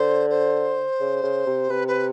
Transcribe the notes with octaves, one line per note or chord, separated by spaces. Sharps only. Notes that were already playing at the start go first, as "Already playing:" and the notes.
Already playing: D3 C5
C5
C#3
C#3
C3
C3 B4
B4